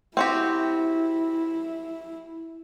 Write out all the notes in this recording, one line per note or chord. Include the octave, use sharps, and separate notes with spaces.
C4 E4 F#4 G4